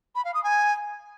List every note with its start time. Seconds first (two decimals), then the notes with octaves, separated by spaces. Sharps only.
0.15 B5
0.25 F5
0.34 D#6
0.44 G#5